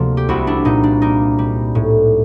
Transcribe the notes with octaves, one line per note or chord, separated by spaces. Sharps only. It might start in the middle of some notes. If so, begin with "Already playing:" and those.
Already playing: D2 C3 F3 A#3
G4
C2 E4 F#4
D4 E4
A#2 D#4
D4
A#3 D#4
G3
A2